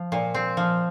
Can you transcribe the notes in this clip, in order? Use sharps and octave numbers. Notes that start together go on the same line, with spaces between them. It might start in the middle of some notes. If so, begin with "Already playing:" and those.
Already playing: F3
A#2
C4
F3